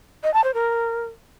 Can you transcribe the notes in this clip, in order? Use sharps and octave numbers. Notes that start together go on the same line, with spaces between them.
D#5
A5
C5
A#4